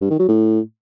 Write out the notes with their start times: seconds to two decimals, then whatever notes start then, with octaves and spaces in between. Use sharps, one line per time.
0.02 G2
0.11 D#3
0.20 F#3
0.29 A2